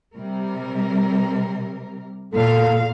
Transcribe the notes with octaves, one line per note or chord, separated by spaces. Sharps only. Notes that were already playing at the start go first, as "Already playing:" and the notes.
C3 G3 A#4
E2 A#2 A4 F5